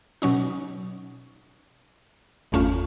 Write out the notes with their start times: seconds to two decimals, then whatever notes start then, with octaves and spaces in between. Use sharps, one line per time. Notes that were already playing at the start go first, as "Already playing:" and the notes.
0.22 B2 F#3 C#4 D#4
2.52 G1 E2 A3 C#4 F4